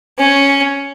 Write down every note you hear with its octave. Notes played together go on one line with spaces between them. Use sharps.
C#4